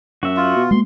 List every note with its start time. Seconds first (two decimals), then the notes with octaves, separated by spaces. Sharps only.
0.23 F#2 F#4 E5
0.37 F4
0.56 B2
0.71 G#3 A#3 C6